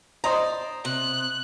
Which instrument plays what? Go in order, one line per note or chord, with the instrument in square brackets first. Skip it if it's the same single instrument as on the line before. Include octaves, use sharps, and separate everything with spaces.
[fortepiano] C5 D#5 A#5 [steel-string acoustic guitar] D5
[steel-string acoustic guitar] C3 [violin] F#6